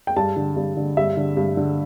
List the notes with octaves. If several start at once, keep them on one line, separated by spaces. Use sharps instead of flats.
G5
G2 A5
D3
G2
D3
G2 E5
D3
G2
D3